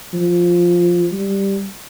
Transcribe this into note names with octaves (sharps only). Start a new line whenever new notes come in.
F3
G3